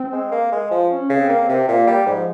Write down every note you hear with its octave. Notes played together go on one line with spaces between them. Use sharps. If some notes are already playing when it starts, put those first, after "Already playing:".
Already playing: C4
G#3
A#3
G#3
F3
C#4
C#3
C4
A#3
C4
C3
A#2 A#3
G3
G#2 F3